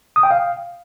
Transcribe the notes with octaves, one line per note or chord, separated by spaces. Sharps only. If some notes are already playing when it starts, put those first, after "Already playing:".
D#6
G5
F5